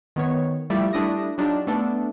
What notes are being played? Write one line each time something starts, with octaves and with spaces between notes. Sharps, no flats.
D#3 B3 C#5
F3 G3 A3 E4 D5 E5
G3 A3 D4 E4 D#6 A#6
F#3 D4 D#4 F4 G4
A3 B3 D4 A4